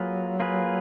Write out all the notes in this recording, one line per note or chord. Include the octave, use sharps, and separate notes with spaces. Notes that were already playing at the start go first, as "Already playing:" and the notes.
Already playing: F#3 A#3 F4 G#4 B4
A#3 F4 G#4 B4